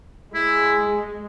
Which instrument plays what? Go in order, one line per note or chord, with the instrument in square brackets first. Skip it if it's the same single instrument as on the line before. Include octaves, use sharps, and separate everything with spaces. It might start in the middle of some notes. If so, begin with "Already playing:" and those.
[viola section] G#3 [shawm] E4